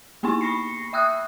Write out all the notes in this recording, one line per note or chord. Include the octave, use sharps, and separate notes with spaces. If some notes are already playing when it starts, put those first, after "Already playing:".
A#3 B3 D#4 E4 G#5 C#6
B5 C#6 A#6 C7 C#7
E5 G5 D#6 E6 F#6